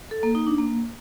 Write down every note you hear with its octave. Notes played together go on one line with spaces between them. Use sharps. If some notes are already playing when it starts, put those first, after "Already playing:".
A4
A#3
D#4
D4
A#3